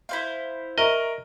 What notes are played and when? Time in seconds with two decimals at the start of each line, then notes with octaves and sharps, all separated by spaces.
0.09 E4 C5 F5
0.78 A#4 D#5 E5 A#5 C#6